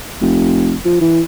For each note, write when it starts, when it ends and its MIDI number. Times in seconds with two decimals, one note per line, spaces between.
0.21 0.76 29
0.85 1.00 53
1.01 1.21 52